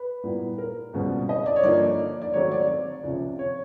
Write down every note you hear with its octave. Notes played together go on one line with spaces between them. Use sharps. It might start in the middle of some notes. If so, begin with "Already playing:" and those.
Already playing: B4
A#2 G3 B3 E4
A#4
C#2 B2 G3 C4
D#5
D5
C#5
G2 D3 F3 A#3 D#4 D5
D5
G#2 D#3 F#3 A3 C4 C#5
D5
C#5
D5
C#2 C3 F3
C#5